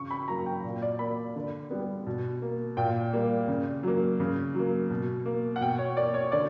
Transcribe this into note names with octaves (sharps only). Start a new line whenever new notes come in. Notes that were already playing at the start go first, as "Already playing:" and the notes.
Already playing: C#3 C#6
B5
F#3 A#3 A#5
G5
A#2
D5
A#3 B5
D3
G3 B3
B2
A#3
A#2 G5
G3 A#3
C#3
F#3 A#3
C#3
F#3 A#3
B2
A#3
F#5
B2 G5
C#5
A#3 D5
C#5
D3 D5